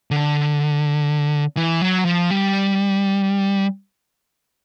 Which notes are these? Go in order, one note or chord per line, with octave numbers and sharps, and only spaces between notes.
D3
E3
F#3
F3
G3